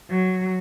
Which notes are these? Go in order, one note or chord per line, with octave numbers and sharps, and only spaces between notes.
F#3